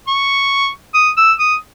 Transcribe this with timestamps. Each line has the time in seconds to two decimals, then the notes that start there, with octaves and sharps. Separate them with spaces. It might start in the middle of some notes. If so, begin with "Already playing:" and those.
0.08 C#6
0.95 D#6
1.17 E6
1.39 D#6